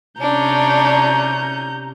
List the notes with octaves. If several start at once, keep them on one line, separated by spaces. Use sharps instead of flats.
C3 C#4 D4 A#5 G6